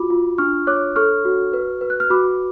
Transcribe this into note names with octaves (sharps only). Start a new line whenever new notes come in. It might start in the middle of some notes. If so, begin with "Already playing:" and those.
Already playing: F4 F#4 B5 D6
F4
D4 C#6 F6
C#5 D6 F#6
A4 C#6 F6
F#4
B4
B4
F#6
F6
F#4 B5 D6